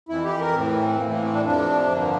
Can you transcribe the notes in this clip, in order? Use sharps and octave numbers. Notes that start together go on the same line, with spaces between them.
F2 E3 E4
G4
A#4
A2 E3 C4
A2 E3 A#3
A#3
C4
D4
F2 C3 F3 D4
G2 D3 F3 A#3